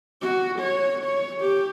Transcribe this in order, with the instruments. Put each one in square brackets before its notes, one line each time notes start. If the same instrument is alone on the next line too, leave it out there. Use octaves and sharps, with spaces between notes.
[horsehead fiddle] F#4
C#5
C#5
G4